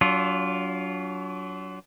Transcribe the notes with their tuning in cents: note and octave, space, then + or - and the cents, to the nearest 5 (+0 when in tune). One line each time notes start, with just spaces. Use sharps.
F#3 +15 D4 -40 F4 +0